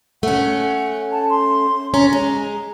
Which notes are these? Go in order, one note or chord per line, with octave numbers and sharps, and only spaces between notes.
A3 C#4 F#5
A5
C6
C#4 A#5
G#3